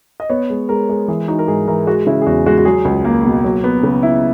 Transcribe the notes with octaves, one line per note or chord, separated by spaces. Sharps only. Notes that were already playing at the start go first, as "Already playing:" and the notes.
D#5
B3 C#5
G#3
G#3 A#4
G#3
E3 G#4
D#4 F#4
A#4
G#2 G#4
E3 A#4
G#3 F#4
C#3 E4
G#4
E2 F#4
G#3 F#4
F#4
F#3 G#4
C#2
A#3
B2
F#3
B3
C#3
E4